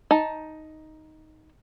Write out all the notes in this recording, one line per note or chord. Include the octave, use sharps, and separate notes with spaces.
D#4 A5